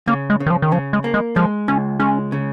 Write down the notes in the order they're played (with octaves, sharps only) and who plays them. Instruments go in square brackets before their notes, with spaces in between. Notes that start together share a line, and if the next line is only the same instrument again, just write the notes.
[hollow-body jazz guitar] C#3 [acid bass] A#3
[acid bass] G#3
[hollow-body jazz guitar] C#3
[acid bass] D#3
F3
D#3
[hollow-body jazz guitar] C#3 [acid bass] F3
[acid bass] G#3
[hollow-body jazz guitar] A#3
[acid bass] G#3
[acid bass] F3 [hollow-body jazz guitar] G#3
[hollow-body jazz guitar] C#2 [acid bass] C#4
[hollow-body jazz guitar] G#3 [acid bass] C#4
[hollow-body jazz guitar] C#3